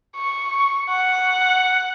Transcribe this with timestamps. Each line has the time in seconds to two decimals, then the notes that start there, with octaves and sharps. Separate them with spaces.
0.16 C#6
0.89 F#5